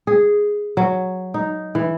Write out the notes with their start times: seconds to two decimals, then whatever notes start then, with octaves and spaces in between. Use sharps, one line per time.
0.07 G#4
0.77 F#3
1.34 D#4
1.75 E3